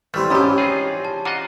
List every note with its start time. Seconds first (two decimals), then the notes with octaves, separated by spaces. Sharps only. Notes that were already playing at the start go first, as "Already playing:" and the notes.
0.14 E3 G3 A3 C4 B5 F6
0.30 G#2 F3 C#4 G4 B5 E6
0.58 D#4 F4 G#4
1.05 A5
1.25 F4 F#4 D#5 F#5 A#5 D6